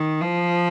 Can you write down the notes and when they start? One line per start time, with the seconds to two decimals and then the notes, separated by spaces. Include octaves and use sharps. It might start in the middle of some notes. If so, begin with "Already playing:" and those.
Already playing: D#3
0.22 F3